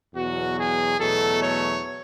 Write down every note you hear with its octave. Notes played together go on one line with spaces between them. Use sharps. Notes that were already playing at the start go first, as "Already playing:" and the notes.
E2 B2 F#3 F#4
G#4
E2 B2 F#3 A3 A4
C#5